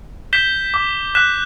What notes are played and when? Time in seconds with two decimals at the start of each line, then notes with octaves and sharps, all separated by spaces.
0.33 G6 B6 E7 G7
0.74 D6
1.15 F#6 B6 E7